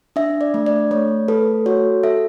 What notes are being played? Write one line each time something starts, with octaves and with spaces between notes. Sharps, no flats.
D4 E5
D5
A3
D5
A3 C#5
A4 B4
F#4 C#5
A4 E5